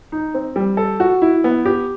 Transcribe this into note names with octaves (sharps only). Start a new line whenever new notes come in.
D#4
C4
G3
A4
F#4
E4
B3
G4